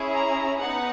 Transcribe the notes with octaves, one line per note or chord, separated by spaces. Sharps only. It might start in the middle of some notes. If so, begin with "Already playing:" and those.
Already playing: C#4 E4 G#4
A#5
B3 D#4 F#5